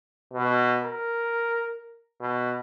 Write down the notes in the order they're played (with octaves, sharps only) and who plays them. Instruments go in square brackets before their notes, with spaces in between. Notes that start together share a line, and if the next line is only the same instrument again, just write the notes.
[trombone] B2
A#4
B2